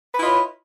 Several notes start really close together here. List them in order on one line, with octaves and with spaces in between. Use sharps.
B4 E4 D#5 F4 C#5